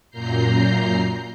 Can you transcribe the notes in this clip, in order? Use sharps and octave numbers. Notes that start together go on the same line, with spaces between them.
F#2 A#2 A#5 G6 C7